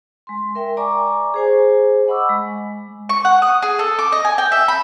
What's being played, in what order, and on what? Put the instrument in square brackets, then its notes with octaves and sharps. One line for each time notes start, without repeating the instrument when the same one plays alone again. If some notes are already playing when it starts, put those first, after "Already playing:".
[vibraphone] G#3 C6
A#4 E5 G5
D5 G#5 A#5 C#6 D6
G#4 C5 G#5
D#5 F#5 B5 C#6 D6 E6
G#3
[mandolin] C#6
F#5
D#6
G#4
A4
D6
D#5
G#5
G5
E5
B5